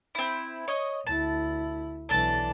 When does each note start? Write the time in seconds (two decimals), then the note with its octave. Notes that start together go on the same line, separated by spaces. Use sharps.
0.15 C4 E4
0.68 C#5 D#5
1.07 D2 E4 A5
2.09 B1 E3 D4 A4 A5